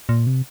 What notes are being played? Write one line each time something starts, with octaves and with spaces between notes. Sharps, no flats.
A#2
C3